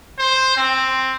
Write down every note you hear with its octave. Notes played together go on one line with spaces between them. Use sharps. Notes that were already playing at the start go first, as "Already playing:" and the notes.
C5
C4